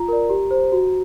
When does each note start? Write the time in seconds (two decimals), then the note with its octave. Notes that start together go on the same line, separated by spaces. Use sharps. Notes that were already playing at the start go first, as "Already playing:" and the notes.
Already playing: F4 A#5
0.08 A#4 D5
0.29 G4
0.51 C5
0.72 F#4